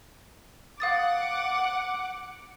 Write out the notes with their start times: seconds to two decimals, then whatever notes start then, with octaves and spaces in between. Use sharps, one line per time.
0.80 F5 F#5 D6 D#6 A6